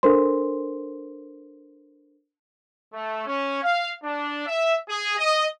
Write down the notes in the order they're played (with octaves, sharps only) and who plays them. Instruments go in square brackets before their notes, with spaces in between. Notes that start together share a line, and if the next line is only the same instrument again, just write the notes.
[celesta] D4 A4 A#4 C5 C6
[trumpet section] A3
C#4
F5
D4
E5
G#4
D#5